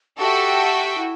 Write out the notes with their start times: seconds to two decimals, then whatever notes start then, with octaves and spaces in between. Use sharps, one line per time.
0.19 F#4 G4 A4 E5 G5
0.97 E4